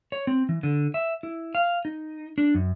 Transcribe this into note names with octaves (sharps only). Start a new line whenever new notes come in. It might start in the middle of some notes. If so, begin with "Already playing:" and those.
C#5
C4
E3
D3
E5
E4
F5
D#4
D4
F#2